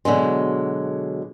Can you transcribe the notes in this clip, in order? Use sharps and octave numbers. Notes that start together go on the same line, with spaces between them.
B2 D3 F#3 G#3